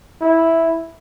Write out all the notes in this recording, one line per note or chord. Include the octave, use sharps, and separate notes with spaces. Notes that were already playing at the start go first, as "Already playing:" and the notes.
E4